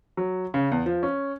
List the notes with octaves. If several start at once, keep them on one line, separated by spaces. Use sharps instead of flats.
F#3
C#3
E2
F3
C#4